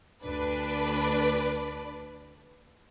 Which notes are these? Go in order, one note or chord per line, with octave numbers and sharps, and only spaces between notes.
D2 D4 B4 D5